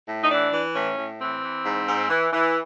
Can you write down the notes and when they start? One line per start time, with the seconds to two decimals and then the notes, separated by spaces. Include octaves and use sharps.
0.09 A2
0.24 D#4
0.30 E3 D4
0.53 E3
0.75 A2 C#4
0.98 A2
1.20 E3 C4
1.43 E3
1.66 G#2
1.88 G#2
2.10 E3
2.32 E3